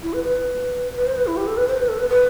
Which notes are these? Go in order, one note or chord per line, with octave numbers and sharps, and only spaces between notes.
E4
B4
B4
B4
C5
B4
E4
G4
A4
B4
C5
B4
A4
B4
B4